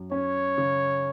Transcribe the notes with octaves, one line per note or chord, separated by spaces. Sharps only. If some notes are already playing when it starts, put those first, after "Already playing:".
Already playing: F#2
C#4 C#5
C#3